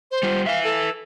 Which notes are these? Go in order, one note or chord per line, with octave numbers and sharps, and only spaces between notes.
C5
G3 F4
B4 E5 F5
A4